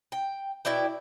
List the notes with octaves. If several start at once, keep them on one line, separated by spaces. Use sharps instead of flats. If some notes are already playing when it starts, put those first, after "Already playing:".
G5
B2 E4 D5 G5